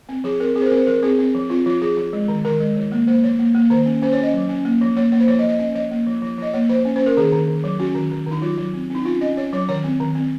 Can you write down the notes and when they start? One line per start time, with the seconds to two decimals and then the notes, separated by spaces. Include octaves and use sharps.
0.09 C4
0.24 F3 G#4
0.40 C4 A#4
0.56 C4 G#4
0.62 C5
0.66 A#4
0.72 C4
0.77 C5
0.87 F3 A#4
1.03 C4 G#4
1.19 C4
1.34 F3
1.50 C4 F4
1.66 F3 F4
1.82 F3 G#4
1.97 F3
2.13 G#3
2.28 D#3
2.45 D#3 A#4
2.60 G#3
2.76 F3
2.92 A#3
3.07 A#3 C5
3.23 F3 C#5
3.39 A#3
3.54 A#3
3.70 D#3 C5
3.86 C#4
4.02 C#4 C5
4.13 C#5
4.18 C#4 D#5
4.33 F#3
4.49 C#4
4.65 A#3
4.81 F3
4.97 A#3 C#5
5.12 A#3 C#5
5.20 C5
5.27 F3 C#5
5.39 D#5
5.43 F3
5.49 D#5
5.59 C#4 D#5
5.75 F3 D#5
5.91 A#3
6.07 F3
6.22 F3
6.38 F3 D#5
6.54 A#3 C#5
6.69 F3 C5
6.85 C#4
6.96 C5
7.01 C#4
7.06 A#4
7.17 D#3 G#4
7.33 D#3
7.48 D#3
7.64 F#3
7.79 C#4 F#4
7.95 D#3
8.11 D#3
8.27 D#3 D#4
8.42 F#3 F4
8.58 F#3
8.74 C4
8.90 C4 D#4
9.05 C#4 F4
9.21 C#4 D#5
9.36 C#4 C#5
9.53 F#3 C#5
9.69 D#3 C#5
9.84 C4
10.00 D#3
10.15 C4